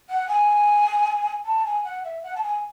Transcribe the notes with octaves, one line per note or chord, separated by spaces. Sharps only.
F#5
G#5
A5
G#5
F#5
E5
F#5
A5
G#5